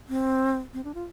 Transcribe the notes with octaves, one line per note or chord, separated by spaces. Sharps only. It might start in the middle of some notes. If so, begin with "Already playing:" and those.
C4
C4
D4
F4